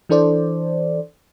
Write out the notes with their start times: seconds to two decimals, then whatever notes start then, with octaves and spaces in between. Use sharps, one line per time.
0.09 E3 D4 A4 C5 D5